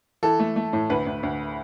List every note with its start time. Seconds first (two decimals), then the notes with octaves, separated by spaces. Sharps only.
0.23 E3 A4
0.39 A3
0.56 A3
0.73 A2
0.90 D2 B4
1.07 D2
1.23 D2